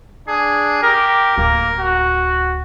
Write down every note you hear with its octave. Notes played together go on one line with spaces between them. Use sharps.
D4 G#4
G4 A#4
D1 A#3
F#4